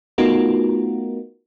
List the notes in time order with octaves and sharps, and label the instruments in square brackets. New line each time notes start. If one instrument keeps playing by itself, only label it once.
[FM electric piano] A3 B3 D#4 F4 F#4 A#4